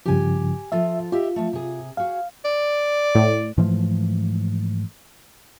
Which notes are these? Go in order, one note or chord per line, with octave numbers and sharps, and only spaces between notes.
G2 C#3 F3 G4 G#5
F3 F4 A4 E5
F4 G4 D#5 E5
F3 A3
C3 G#4
F#4 G#4 F5
D5
A2
G#2 E3 F3 A3